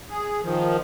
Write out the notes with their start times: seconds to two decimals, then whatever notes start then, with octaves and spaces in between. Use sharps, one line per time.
0.10 G#4
0.43 D#3 F3